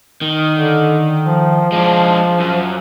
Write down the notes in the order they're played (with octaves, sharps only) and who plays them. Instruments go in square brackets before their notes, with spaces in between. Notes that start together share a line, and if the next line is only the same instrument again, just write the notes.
[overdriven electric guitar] D#3
[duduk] D3
F3
[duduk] F3 [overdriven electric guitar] G#3 D4
[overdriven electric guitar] F#2